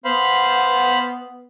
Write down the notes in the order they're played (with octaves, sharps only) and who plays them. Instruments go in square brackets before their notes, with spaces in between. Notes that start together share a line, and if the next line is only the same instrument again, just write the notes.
[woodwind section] B3 [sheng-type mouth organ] C5 F5 B5